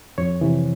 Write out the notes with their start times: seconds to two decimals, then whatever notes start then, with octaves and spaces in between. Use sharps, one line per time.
0.18 F2 C#5
0.41 C3 E3